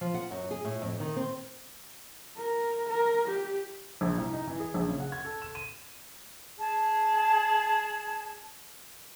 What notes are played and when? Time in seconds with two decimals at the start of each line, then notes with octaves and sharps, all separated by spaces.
0.01 F3
0.14 F#5
0.31 F#2
0.51 G#4
0.65 A2
0.82 F2
1.00 D#3
1.16 C4
2.37 A#4
2.89 A#4
3.28 G4
4.01 A#1
4.18 C2
4.33 D#4
4.47 E3
4.60 G#4
4.74 A#1
4.88 C#3
5.00 F#5
5.12 G#6
5.25 A4
5.42 E7
5.55 D#7
6.58 G#4 A5